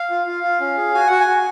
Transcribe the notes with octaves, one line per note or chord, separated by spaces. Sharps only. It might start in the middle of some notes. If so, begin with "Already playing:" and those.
Already playing: F5
F4
F4
F4
C#4
G#4
F#4 G#5
F#4 F#5
G#5
F#4